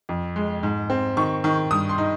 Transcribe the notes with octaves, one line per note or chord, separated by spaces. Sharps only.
F2
G#3
G#2
C4
D#3 C#6
D#3
G2 D#6
C6
D#4